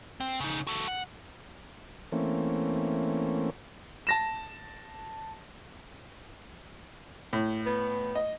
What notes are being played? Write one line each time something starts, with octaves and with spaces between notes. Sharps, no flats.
C4
C#3 D#4
F#4 A4
F#5
E3 A3 A#3 C4 C#4
A5 A#6 E7
A2
B3
D#5